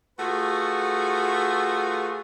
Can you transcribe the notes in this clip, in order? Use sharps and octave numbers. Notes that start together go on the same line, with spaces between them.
A3 F4 F#4 G#4 B4